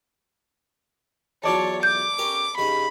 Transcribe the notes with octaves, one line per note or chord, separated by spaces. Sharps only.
E2 F#3 F4 A4 C#5 D5 A5
D6 G6
C#4 G4 A#4
G2 C#3 D#4 B5